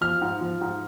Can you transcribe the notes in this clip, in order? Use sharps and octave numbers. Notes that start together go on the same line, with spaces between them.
F3 F6
G#2
F3
G#2